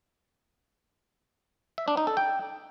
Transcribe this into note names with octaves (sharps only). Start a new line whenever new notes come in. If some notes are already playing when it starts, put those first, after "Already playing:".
E5
D4
D#4
A4
G5